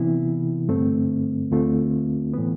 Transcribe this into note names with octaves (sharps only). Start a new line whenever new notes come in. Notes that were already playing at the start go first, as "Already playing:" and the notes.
Already playing: C3 E3 B3 E4
G2 D3 A3 C4
D2 D3 A3 C4 F4
A2 E3 B3